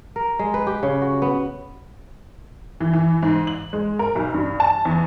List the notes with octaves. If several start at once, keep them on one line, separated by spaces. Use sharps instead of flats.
A#4
G#3
B4
G4
C#3
F#4
B3
E3
E3
G#2
F#7
G#3
A#4
B1
G2
A5
E2